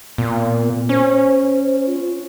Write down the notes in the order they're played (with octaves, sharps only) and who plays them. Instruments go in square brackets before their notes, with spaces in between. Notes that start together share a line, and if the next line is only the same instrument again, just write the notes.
[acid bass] A#2 [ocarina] B3
[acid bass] C#4 [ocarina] C5
[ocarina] F4